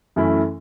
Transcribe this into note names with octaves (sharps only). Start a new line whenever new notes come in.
F#2 E3 A3 C#4 E4